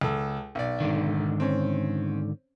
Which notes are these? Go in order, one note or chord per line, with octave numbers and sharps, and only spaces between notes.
C#2 A4
B1 D5
G#2 D3 D#3
C4 C#4